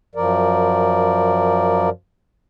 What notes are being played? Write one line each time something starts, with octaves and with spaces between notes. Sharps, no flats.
F#2 F3 A#4 D5